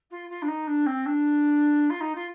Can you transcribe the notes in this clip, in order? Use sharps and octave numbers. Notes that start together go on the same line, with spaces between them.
F4
F4
D4
D#4
D4
C4
D4
F4
D#4
F4